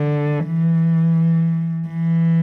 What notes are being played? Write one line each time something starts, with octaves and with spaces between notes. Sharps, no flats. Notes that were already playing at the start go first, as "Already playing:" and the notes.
Already playing: D3
E3
E3